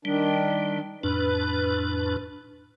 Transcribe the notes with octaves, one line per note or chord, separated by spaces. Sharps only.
D#3 G3 D4
F2 A2 D4 B4